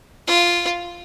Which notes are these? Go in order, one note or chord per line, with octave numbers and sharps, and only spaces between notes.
F4